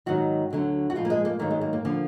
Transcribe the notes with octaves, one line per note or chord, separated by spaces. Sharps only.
G#2 D#3 F#3 F#4
D2 D3 F#3
F#4
G#2 F3 F4
A#3
G#3
A#3
G#2 D#3 F#3 A#3
G#3
A#3
A#3
D3 F3 A#3